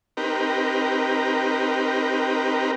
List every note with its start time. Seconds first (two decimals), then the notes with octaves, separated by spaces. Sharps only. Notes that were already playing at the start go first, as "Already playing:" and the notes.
0.17 C4 D#4 G4 A#4 B4